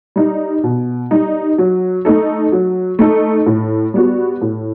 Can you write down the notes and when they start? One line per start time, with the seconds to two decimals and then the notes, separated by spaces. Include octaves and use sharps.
0.16 G3 D#4
0.64 B2
1.11 G3 D#4
1.58 F#3
2.05 A3 D#4 A4
2.52 F#3
2.99 A3 D#4 A4
3.46 A2
3.94 G3 B3 F#4
4.42 A2